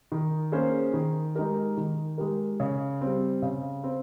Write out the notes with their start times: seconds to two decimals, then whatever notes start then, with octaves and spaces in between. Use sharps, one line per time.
0.12 D#3
0.52 A#3 C#4 G#4 C5
0.94 D#3
1.36 G#3 D#4 G4 A#4
1.77 D#3
2.18 G#3 D#4 G4 A#4
2.60 C#3
3.01 G3 C4
3.42 C#3
3.84 C4